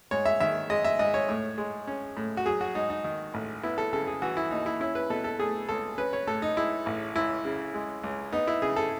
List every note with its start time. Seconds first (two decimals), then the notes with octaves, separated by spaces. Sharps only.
0.11 G#2 C#5
0.26 E5
0.40 D#3 E5
0.70 G#3 D#5
0.85 E5
0.99 G#2 D#5
1.14 C#5
1.29 A2
1.58 G#3
1.87 C#4
2.17 A2
2.37 F#4
2.46 F#3 G#4
2.61 F#4
2.75 G#2 D#4
2.90 D#4
3.04 D#3
3.34 A1
3.63 B3 E4
3.78 A4
3.93 C#3 A4
4.07 G#4
4.22 E3 F#4
4.37 E4
4.51 D#2 D#4
4.66 E4
4.80 C#4 E4
4.95 B4
5.10 B2 A4
5.24 A4
5.39 A3 G#4
5.69 C#2 A4
5.98 C#4 B4
6.13 C#5
6.27 A2 A4
6.42 D#4
6.57 G#3 E4
6.86 A1
7.15 C#2 E4
7.45 C#3
7.74 G#3
8.03 C#2
8.33 B3 D#4
8.47 E4
8.62 C#3 G#4
8.76 A4